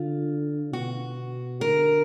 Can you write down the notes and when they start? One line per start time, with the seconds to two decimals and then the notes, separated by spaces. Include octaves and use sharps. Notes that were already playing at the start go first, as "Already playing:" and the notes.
Already playing: D3 F4
0.72 B2 F#4
1.61 D3 A#4